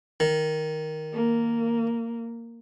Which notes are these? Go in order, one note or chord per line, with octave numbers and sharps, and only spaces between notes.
D#3
A#3